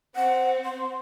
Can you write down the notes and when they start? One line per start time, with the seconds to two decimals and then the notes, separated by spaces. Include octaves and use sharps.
0.16 C4 F#5
0.64 C6